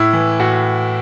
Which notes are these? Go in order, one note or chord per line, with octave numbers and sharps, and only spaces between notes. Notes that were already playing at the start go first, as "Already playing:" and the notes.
Already playing: A2 E4
E3
A2 F#4